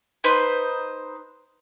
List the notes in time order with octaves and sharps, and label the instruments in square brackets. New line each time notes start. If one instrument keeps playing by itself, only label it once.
[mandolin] D#4 B4 C5